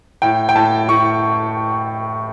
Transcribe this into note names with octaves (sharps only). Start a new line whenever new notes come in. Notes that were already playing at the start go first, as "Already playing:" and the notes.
A2 G5
G5
A2 A5
A2 C#6